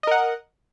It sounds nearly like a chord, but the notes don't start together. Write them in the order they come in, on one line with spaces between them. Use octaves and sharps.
D#5 A#4 F#5